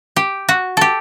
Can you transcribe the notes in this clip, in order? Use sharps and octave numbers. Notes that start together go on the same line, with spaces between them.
G4
F#4
G4 A4